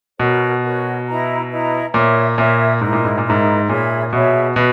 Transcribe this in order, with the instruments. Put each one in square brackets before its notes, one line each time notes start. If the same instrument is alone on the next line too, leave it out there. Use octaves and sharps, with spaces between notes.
[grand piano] B2 [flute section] F#4 A#4 C#5
[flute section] F#4 A#4 C#5
E4 B4 D#5 A#5
E4 B4 D#5 A#5
[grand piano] A#2 [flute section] A#4 C#5 E5
[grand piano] A#2 [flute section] A#4 C#5 E5
[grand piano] G#2 [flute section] E4 A#4 D#5
[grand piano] A#2
G#2
A#2
[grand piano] G#2 [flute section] E4 A#4 D#5
[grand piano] A#2 [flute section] G#4 C#5 E5 B5
[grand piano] B2 [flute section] G#4 C#5 E5 B5
[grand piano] B2 [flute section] B4 F#5 B5